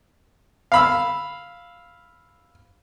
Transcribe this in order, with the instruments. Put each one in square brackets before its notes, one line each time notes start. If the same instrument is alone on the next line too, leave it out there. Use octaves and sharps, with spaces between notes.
[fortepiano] F5 B5 E6